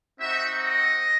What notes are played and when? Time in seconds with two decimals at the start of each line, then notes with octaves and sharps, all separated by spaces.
0.19 C4 D#4 F#4 E5
0.56 D#5